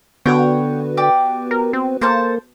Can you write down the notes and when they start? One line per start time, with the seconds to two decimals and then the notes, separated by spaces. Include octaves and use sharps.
0.26 D3 B3 F#4 B4 C#5 F#5 G5
0.97 G4 D5
1.51 A#4
1.73 C4
2.01 A#3 A4 C5 A5